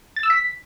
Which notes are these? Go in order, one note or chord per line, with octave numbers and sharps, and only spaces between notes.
A6
E6
B6